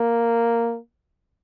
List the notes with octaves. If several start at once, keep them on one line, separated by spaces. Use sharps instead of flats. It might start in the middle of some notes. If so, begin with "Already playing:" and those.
Already playing: A#3